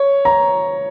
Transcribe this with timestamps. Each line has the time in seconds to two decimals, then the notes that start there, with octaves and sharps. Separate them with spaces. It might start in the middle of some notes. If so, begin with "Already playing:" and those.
Already playing: C#5
0.25 A#5